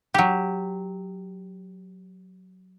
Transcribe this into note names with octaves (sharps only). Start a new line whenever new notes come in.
F#3 G4